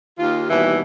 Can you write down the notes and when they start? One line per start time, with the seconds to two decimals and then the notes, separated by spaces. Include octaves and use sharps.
0.18 D#2 F4
0.50 D#2 B2 E3 G3 E5